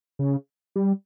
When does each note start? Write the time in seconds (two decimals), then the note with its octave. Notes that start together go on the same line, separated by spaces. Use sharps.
0.19 C#3
0.76 G3